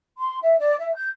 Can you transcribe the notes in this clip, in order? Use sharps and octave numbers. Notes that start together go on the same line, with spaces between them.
C6
E5
D5
E5
G6